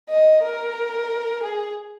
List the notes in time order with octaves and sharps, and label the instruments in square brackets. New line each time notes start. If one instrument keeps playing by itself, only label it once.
[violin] D#5
A#4
G#4